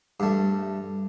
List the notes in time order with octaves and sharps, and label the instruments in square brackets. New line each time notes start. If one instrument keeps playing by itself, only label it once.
[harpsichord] G2 A3